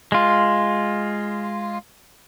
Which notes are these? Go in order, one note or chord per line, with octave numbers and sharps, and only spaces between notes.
G#3 F4